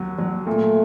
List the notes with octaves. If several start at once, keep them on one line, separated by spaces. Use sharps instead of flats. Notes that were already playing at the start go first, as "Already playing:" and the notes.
Already playing: D#2 F#3
F#3
A#2 A3